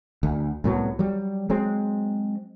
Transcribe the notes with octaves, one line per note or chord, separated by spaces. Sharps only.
D2
C2 A2 F#3 B3
F#3 G3
F#3 G#3 C4